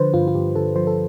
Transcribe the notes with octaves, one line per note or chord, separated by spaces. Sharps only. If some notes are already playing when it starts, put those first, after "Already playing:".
Already playing: D3 F3 B4 C5
G2 F4
F4
G2 G4
D3 A4
F3 C5
A4